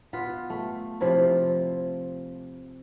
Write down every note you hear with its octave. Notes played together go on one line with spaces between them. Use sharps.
B3 F4 B4
A3
C3 F3 E4 F4